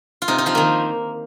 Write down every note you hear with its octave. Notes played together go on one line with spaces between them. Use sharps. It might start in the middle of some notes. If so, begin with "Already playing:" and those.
F4
C3 D#4
D#4
F3 F4
D#3 A#3